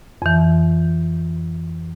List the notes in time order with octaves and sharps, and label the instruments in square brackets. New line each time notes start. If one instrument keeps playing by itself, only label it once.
[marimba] F2 E3